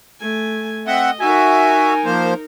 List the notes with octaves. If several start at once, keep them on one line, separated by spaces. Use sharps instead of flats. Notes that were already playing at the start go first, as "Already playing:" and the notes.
A3 G#5
C4 D#5 E5 F#5
D#4 F#4 A#4 E5 G#5
F3 A#3 C5